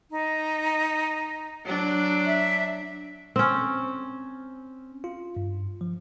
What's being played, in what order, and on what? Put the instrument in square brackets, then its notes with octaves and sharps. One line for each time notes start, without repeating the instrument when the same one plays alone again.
[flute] D#4
[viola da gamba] F#3 D4
[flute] E5
[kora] C4 C#4
[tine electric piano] F4
G2
F3